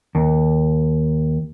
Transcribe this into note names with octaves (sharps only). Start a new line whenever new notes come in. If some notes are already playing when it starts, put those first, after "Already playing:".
D#2